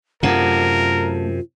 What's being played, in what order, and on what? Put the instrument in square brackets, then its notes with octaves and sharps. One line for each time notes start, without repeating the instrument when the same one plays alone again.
[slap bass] F#2 C3 [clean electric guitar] A3 F5 F#5 [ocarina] F4 [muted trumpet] A#4